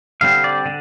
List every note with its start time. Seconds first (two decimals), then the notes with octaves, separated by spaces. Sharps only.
0.21 D3 G3 C4 F5
0.44 D5
0.66 D3